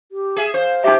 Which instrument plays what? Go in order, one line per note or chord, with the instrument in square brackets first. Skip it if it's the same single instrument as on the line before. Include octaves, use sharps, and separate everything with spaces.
[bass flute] G4
[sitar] G#4 E5
[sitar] C5 [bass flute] F5
[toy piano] D#4 E5 [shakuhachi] G4